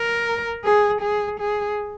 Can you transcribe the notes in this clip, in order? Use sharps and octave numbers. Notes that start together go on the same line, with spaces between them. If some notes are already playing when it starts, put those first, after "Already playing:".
Already playing: A#4
G#4
G#4
G#4